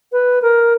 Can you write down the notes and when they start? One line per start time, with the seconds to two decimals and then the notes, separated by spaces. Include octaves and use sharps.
0.12 B4
0.41 A#4